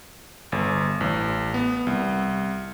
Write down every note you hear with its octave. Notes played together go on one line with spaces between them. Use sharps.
G1
A1
B3
C2